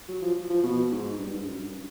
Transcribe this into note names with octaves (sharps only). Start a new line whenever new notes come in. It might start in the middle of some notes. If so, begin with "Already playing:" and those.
F#3
F3
F3
B2
G#2
G2
G#2
F#2
G2